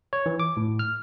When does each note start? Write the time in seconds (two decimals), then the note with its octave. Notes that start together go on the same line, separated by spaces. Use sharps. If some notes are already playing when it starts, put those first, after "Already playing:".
0.13 C#5
0.26 E3
0.40 D6
0.57 A2
0.79 F6